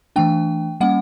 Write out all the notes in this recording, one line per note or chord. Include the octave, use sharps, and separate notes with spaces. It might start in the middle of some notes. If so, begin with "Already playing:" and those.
E3 A3 D4 G5
G3 A#3 C#4 F#5